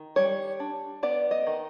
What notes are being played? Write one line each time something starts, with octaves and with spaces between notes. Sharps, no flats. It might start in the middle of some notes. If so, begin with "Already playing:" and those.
Already playing: D#3
G3 C#5
D4
B3 D5
D#5
D#3